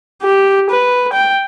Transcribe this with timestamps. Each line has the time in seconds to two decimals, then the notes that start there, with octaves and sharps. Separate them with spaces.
0.22 G4
0.70 B4
1.13 G5